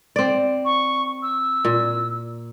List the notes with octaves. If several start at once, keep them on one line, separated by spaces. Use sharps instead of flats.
C4 D5
C#6
E6
A#2